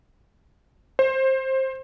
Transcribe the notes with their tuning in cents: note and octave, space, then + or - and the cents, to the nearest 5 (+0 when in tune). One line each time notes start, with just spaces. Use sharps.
C5 +20